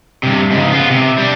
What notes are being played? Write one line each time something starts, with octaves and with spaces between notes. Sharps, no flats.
G2 C3
G#2 C#3
B3 F4
C3
G3 D4